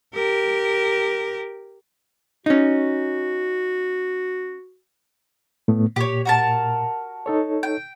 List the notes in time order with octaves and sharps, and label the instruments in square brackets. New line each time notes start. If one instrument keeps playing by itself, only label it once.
[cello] G4 A#4
[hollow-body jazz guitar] C#4 D#4 [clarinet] F#4
[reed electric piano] A2 A3 B3
[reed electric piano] A#2 [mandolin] G4 C#5
[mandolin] F#4 A#4 A5
[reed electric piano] D#4 A4 C#5
[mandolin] G5